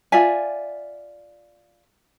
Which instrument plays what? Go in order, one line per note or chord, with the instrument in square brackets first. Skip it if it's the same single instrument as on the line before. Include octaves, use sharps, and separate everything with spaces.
[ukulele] F4 D5 E5 G#5